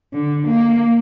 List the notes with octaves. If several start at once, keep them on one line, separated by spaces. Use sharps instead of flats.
D3
A#3